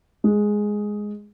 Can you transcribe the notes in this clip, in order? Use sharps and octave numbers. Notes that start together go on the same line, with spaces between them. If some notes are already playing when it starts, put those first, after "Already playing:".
G#3